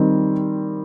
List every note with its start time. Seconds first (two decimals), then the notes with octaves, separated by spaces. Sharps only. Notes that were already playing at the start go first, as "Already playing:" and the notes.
Already playing: D#3 G3 C4